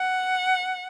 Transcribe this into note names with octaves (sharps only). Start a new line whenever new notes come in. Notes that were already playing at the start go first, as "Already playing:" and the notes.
Already playing: F#5